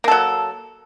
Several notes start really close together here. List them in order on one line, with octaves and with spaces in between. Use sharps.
A#3 A4 F#3